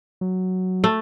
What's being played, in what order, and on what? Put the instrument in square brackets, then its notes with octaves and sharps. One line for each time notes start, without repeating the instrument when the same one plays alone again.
[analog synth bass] F#3
[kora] A3